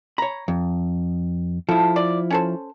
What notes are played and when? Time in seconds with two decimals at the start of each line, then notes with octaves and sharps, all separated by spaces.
0.18 C#5 A#5 B5
0.48 F2
1.69 F3 E4 A4
1.96 D5
2.31 C#4 A4 C5